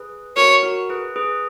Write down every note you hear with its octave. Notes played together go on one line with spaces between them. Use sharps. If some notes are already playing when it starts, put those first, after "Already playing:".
Already playing: G#4 B4
F#4 A#4 C#5
F#4 A#4
G#4 B4
G#4 B4